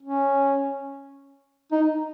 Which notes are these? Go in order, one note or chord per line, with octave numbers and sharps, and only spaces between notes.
C#4
D#4